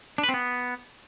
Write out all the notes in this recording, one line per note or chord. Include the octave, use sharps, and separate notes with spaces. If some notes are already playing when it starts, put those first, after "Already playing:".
D4
B4
C4
B3